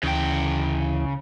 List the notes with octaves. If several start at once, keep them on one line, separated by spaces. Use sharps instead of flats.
D2 C#3 E3 G5